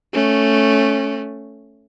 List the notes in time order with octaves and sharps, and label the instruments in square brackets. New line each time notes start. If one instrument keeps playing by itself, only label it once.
[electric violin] A3 C#4